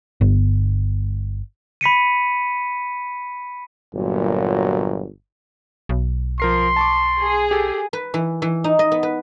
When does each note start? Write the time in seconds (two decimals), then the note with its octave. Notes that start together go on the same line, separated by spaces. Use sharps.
0.21 G1
1.81 B5 B6 C#7 D#7
3.94 G1 A#2 F#3
5.89 B1
6.40 F3 A#4 C6 C7
6.76 A5 C#6 D6
7.18 G#4
7.51 G4 A4
7.93 B4
8.14 E3
8.42 E3
8.64 D#4
8.79 D#5
8.92 B3
9.03 B4